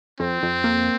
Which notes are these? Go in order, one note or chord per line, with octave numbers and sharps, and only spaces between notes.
F2 C4
F2
A#3